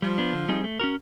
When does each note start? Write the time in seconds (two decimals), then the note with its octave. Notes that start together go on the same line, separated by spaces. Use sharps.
0.02 F3 G3
0.18 B3 D4
0.33 D3
0.48 G3 C4 D#4 G#4
0.64 A3
0.80 C#4 F#4 A#4